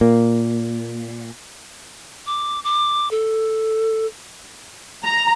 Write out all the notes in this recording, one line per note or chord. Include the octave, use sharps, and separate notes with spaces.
A#2 A#3
D6
D6
A4
A#5